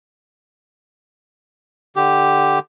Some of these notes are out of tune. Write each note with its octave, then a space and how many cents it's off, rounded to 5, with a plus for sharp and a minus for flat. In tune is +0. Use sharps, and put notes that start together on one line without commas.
D3 +10 G4 +0